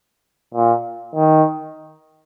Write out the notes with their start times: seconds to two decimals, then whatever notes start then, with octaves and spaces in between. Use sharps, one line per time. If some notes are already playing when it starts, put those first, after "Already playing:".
0.54 A#2
1.15 D#3